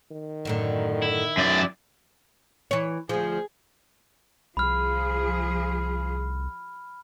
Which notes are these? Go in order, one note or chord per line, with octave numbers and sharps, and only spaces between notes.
D#3
F#2 A2 D3
E4
F#2 D5
E3 C#5
D2 F3 G#4
C2 F3 G#4 B5 F6